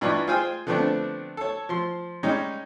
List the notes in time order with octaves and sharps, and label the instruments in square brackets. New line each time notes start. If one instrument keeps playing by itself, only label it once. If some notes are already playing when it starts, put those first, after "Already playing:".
[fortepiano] G2 E3 D#4 F4 D5 C#6
F4 G#4 C5 F5 G5 G#5
D3 F3 A3 B3 C4 D4
A4 C#5
F3 C6
G3 G#3 C#4 D#4